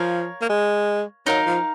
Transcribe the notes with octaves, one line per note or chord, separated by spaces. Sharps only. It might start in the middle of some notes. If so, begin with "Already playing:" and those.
Already playing: F3 A#4 C#5 F5
A#3
G#3
F#3 D#4 A#4 F5
F3